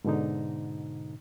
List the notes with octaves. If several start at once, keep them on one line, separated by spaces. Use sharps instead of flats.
G#2 B2 D3 D#4